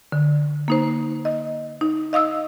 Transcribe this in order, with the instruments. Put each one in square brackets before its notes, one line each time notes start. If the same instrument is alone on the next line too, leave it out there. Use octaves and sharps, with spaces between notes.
[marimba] D3
A#3 D#4 C5
D#5
D#4
D#5 F5 D#6 E6